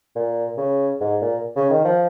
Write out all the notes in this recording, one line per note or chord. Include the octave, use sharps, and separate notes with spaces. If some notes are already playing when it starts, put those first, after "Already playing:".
A#2
C#3
G#2
A#2
C#3
D#3
F3